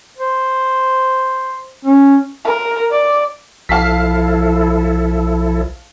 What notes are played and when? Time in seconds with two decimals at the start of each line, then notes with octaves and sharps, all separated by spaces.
0.18 C5
1.85 C#4
2.45 A#4
2.91 D5
3.69 B1 F3 E4 A4 F5 A5 B6